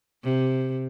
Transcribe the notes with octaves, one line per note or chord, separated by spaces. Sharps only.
C3